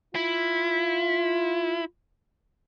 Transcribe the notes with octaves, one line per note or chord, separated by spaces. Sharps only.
E4 F4